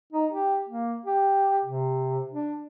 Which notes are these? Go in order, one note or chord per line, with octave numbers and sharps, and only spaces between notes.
D#4
G4
A#3
G4
C3
D4